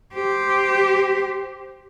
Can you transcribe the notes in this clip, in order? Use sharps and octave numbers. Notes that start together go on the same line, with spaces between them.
G4 C5